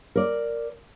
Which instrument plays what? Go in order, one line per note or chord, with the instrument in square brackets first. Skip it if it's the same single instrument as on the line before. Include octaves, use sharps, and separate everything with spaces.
[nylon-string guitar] A#4 D5